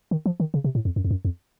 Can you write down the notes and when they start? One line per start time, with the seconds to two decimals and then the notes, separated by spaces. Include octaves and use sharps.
0.11 D#3
0.26 F3
0.40 D#3
0.54 C#3
0.64 C3
0.75 A2
0.85 F2
0.96 F#2
1.04 F2
1.11 F#2
1.25 F2